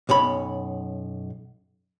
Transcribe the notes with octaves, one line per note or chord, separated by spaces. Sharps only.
B1 F#2 C#5 B5